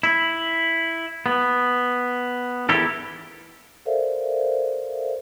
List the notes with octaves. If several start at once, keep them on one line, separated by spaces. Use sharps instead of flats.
E4
B3
E2 E4 G4 A4 A#4
A4 A#4 C5 D5 E5 F5